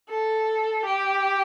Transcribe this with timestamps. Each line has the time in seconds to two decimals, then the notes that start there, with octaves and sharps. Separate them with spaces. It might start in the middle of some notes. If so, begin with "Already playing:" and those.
0.09 A4
0.85 G4